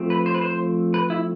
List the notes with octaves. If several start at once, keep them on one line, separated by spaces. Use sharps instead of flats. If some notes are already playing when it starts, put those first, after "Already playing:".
Already playing: F3 A3 C4
B4
C5
B4
C5
B4
E4